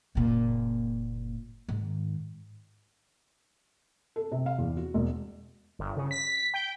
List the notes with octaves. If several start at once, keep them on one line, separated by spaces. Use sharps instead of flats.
F#1 A#2
G#2 D#3
A4
C3
F5
E2
F#4
E1
G1
C#3
B6
G5